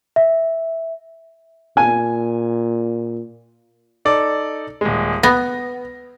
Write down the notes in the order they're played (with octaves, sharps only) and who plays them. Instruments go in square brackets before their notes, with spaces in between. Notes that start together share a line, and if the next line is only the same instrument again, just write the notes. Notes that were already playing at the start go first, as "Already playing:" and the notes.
[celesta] E5
[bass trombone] A#2 [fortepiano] G#5
[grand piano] D#4 A4 D5
D#1 G#3
[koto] B3 [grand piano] A#6